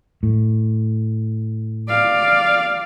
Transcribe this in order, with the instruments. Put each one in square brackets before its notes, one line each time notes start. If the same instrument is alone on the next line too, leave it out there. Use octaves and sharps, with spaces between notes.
[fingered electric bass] A2
[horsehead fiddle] D5 F5